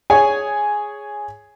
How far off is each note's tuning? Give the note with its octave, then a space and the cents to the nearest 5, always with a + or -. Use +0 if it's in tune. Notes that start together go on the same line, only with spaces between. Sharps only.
G#4 +0 C#5 +5 G#5 +0